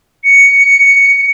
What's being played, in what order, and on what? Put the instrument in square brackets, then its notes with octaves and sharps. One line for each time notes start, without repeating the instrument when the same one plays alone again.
[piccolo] C#7